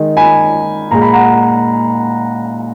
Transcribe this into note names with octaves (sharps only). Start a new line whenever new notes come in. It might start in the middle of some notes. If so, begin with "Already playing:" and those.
Already playing: D#3 G#3
G#5 B5
A#2 G#3 A#5
B5
F#5 A#5